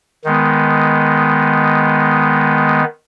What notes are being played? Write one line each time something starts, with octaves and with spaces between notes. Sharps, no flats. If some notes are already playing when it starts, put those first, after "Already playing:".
D#3 G#3 B3